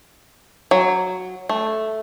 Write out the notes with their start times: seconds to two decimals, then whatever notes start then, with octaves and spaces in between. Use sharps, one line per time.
0.71 F#3
1.49 A3